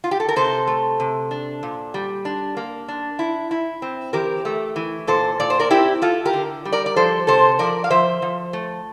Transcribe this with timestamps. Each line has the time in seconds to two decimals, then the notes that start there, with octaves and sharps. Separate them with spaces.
0.04 F4
0.11 G4
0.20 A4
0.29 A#4
0.36 C3 A4 C5
0.67 A3
1.00 C3
1.31 D4
1.63 A#2
1.94 G3
2.25 D4
2.57 A#3
2.88 D4
3.19 E4
3.51 E4
3.82 C4
4.13 E3 G4 A#4
4.45 A3
4.76 E3
5.07 A#2 A4 C5
5.40 A#2 D5
5.50 C5
5.60 A#4 D5
5.71 C4 E4 G4
6.02 E4 F4 A4
6.25 G4 A#4
6.33 D3
6.65 G3
6.72 A#4 D5
6.86 D5
6.96 F3 A4 C5
7.27 C3 A4 C5
7.59 F3 A#4 D5
7.84 F5
7.90 F3 C5 E5
8.22 F3
8.53 A3